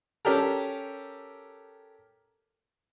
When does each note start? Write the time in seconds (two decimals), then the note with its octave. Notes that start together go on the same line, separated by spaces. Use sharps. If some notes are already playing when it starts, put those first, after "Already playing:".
0.25 C#4 G4 A4 A#4